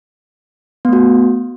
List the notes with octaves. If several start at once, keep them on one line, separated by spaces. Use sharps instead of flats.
A3 B3 F#4